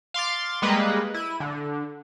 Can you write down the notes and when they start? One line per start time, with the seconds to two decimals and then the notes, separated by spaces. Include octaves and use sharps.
0.14 F5 C6 D6 A6
0.62 G3 G#3 A#3 B4 D#5
1.14 E4 D#7
1.40 D3